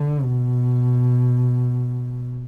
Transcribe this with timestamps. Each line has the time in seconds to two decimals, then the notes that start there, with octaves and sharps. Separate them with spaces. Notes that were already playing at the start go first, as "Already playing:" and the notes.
Already playing: D3
0.23 B2